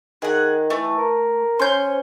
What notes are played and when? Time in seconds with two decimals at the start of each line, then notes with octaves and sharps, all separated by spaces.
0.22 D#3 G#4 F#5
0.70 E3 A3
0.97 A#4
1.59 C#4 C5 C6 G6